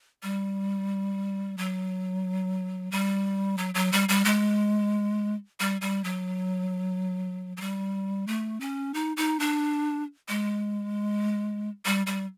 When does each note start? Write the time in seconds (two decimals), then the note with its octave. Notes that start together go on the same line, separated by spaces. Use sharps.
0.23 G3
1.58 F#3
2.91 G3
3.58 F#3
3.74 F#3
3.92 G3
4.09 G3
4.25 G#3
5.60 G3
5.81 G3
6.04 F#3
7.57 F#3
7.61 G3
8.27 A3
8.60 C#4
8.94 D#4
9.17 D#4
9.39 D4
10.29 G#3
11.85 G3
12.07 G3